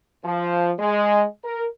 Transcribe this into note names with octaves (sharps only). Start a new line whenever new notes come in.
F3
G#3
A#4